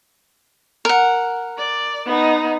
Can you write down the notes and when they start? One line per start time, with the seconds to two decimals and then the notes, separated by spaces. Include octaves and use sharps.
0.85 A#4 F#5
1.57 D5
2.06 B3 D#4